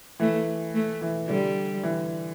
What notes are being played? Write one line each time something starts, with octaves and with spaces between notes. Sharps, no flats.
E3 A3
A3
E3
D3 G3
E3